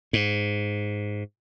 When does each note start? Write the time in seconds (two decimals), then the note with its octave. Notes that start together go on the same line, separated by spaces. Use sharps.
0.13 G#2